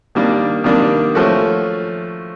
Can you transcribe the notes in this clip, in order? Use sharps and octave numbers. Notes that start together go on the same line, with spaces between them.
D#3 G3 A#3 D4
D#3 G3 A#3 D4
F3 A3 C#4 F#4